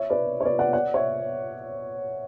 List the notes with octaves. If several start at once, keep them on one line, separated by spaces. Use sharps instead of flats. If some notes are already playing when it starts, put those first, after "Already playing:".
Already playing: C#5 E5
B4 D5
C#5
B4 D5
D5 F#5
D5 F#5
C#5 E5